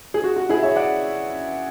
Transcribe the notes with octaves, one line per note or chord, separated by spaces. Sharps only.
G#4
F#4
F#4
E4 G#4
C#5 E5
D5 F#5